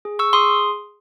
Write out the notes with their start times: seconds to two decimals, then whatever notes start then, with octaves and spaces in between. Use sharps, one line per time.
0.05 G#4
0.19 C#6 E6
0.33 G#4 C6 D#6